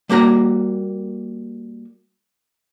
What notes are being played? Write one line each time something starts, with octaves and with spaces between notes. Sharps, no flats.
G3 A#3 F#4 A#5